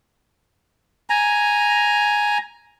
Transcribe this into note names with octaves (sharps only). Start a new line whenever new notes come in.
G#5 A#5